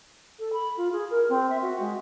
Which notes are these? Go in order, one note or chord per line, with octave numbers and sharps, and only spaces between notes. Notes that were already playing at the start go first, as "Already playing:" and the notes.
A4
B5
F4
G#4
A#4
C4
E5
F#4
G#3